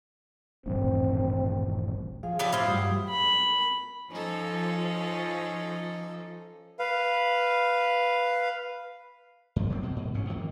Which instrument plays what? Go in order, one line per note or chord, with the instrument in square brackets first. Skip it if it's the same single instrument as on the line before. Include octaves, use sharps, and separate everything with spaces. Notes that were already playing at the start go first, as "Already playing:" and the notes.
[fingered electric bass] D#1 A1 G2 [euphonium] C4
[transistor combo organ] F3 G#4 [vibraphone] F5
[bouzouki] D4 E4 G4 [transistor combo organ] A5 D#6
[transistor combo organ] A2 E5 [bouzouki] E4 F4 C5
[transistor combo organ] G2 F#3 G3 [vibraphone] D#6
[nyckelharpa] B5
[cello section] F3 [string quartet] C#4 [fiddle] D#4 A4
[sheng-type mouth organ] B4 F5
[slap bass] F#2 F3
F#3 G#3 C4
B2
G#2
A1 G#2 B2 C#4
F2 D#3 A#3